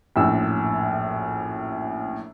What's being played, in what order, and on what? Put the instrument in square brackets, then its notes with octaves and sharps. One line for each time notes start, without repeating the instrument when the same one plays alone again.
[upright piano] A#1 F#2 A2 E6